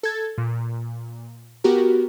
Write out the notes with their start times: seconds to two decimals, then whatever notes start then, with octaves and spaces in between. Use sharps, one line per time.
0.03 A4 G#6 A6
0.38 A#2
1.64 B3 F#4 G4 A#4